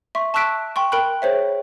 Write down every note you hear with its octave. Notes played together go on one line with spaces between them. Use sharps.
E5 C6 C#6
A5 C#6 E6 F#6 B6 D7
G5 C6 C#6
A#4 G5 B5 F#6
G#4 C5 C#5 E5